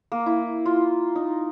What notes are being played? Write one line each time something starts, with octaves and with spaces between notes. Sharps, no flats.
A#3
E4
F4
D#4